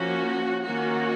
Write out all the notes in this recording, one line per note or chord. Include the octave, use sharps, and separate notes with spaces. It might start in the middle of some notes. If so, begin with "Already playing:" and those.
Already playing: F3 A#3 C#4 F#4
D#3 A#3 C#4 F#4